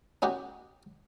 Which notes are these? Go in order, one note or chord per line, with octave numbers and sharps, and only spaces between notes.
C#4 D#4 F#4 G4